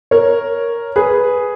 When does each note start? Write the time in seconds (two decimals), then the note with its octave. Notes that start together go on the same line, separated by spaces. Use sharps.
0.11 A#4 C#5
0.96 G#4 B4